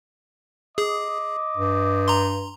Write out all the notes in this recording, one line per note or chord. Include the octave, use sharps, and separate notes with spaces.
G#4 D#5 D6
G2
A#5 C6